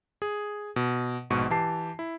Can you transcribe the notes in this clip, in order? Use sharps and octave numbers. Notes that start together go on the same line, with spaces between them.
G#4
B2
A#1 G#2 B2 C#6
E3 G4 A5 C7
E4